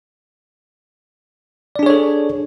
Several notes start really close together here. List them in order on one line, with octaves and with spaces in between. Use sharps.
D5 D4 G#4 C#5 A4